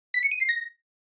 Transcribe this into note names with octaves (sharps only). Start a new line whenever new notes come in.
B6
C#7
D#7
C7
A#6